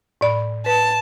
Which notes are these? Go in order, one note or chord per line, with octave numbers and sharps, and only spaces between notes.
A2 D5 B5
B4 A5